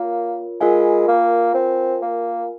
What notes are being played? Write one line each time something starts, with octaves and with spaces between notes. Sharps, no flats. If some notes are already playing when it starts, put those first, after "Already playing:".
Already playing: A#3 F4 A#4 C#5
G#3 F4 A#4 F5 G#5
A#3
C4
A#3